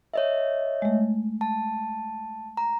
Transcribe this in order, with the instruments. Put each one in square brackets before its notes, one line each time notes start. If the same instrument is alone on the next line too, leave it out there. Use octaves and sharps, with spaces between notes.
[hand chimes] C#5 D#5 E5
[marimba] G#3 A3
[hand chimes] A5
A#5